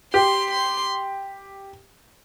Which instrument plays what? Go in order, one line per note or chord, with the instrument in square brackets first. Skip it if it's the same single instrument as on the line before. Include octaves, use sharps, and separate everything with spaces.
[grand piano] G4 [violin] C6
[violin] C6